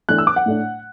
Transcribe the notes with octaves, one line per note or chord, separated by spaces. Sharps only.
E3 A3 D4 F#6
E6
D6
F#5
A2 A3 D4